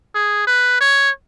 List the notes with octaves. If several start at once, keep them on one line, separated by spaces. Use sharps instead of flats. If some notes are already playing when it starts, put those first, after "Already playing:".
G#4
B4
C#5